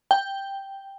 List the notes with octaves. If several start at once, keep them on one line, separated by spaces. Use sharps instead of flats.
G5